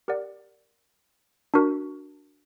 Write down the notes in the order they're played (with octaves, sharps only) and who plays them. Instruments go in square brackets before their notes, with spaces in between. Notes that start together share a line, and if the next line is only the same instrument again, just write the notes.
[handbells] G4 A#4 D5 F#5
D4 F#4 A#4